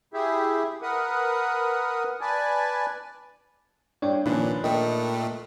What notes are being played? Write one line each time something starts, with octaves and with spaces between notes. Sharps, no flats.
E4 G4 G#4 E5
A#4 B4 F#5 D#6
B4 D5 G#5 A5
G2 C#5 D5 G5
A#2 D#3 F3 C#4 D4 B4 B5
A#2 A3 A#4 D#5 G5